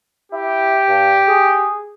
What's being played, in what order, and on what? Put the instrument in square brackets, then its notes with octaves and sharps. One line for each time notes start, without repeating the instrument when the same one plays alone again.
[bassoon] E4 [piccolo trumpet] G4
[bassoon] G2
G#4